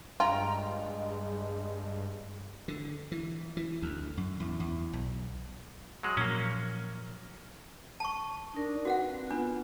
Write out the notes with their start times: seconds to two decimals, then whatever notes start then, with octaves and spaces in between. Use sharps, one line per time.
0.20 G2 G#3 F4 G5 A#5
2.68 D3
3.12 E3
3.57 E3
3.82 D2
4.17 F#2
4.40 E2
4.60 E2
4.93 B1
6.03 F#3 G#3
6.17 A#2 F3 F#3 A#3 C#4
8.00 A5 C#6
8.54 D4 D#4 A#4
8.85 C4 F#4 B4 F5 F#5
9.31 B3 D4 F4